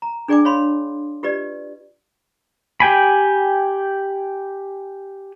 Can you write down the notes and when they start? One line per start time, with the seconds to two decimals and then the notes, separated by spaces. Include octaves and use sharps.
0.02 A#5
0.28 D4 G#4 D5 G5 G#5 D6
0.45 C#5 F5 B5 C6
1.23 F4 G4 B4 D5 D#5
2.80 G4 G5 G#5 B5